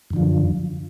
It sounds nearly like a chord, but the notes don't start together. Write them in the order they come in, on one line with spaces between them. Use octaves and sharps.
F#2 D3 F3